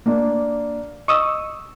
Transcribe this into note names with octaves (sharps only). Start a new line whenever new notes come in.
A#3 D4 D5
D#5 C#6 D#6 E6